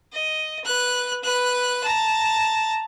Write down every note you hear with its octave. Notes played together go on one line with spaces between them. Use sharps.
D#5
B4 F#6
B4 F#6
A5 A#5